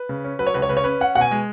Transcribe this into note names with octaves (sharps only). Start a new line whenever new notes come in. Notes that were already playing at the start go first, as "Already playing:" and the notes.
Already playing: B4
C#3
C#4
F#3 B4
C#5
C#2 B4
C#5
C#3 B4
C#5
C#4 B4
C#4 F#5
B2 F#5
G#5
G#3